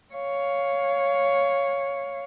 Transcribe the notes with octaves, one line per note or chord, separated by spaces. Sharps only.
C#5 F5